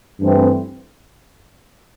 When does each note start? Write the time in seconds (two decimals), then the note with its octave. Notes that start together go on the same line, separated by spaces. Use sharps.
0.21 G2 E3 A3 C4